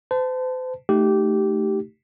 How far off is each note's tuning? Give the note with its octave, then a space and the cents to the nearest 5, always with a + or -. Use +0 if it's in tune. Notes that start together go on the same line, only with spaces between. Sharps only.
C5 -40 A5 +0
A3 +0 D#4 +0 G4 -15